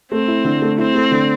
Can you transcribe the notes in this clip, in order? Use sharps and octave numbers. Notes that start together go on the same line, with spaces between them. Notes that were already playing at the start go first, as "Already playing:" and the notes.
A3 C4
E4
D3
A3
C4 E4
A3
D3